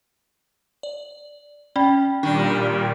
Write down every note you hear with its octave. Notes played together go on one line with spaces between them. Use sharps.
D5
C#4 D5 G5 B5
A#2 D#3 G3 D4